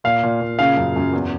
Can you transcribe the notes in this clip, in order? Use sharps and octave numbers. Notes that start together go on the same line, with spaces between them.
A#2 F5
A#2
A#2
C#3 F5
F#2
F#2
E2